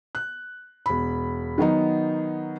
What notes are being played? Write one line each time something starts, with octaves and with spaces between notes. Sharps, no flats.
F#6
E1 B5
D#3 F#3 B3 D#4